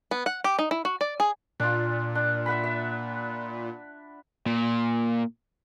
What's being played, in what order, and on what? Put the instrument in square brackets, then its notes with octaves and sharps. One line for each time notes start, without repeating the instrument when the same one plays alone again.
[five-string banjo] B3
F#5
G4
D#4
E4
F#4
D5
G#4
[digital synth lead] A#2 [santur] D4 F4
[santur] D4
E5 F#5 B5
E5
[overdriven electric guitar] A#2